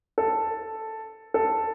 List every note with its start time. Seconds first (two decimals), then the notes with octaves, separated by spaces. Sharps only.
0.18 A4
1.34 A4